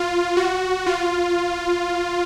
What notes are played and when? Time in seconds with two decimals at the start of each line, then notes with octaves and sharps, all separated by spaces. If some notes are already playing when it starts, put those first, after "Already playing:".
Already playing: F4
0.37 F#4
0.86 F4